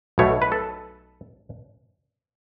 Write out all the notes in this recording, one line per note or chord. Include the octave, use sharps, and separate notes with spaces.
B1 B2 A3 C#5
B4
A4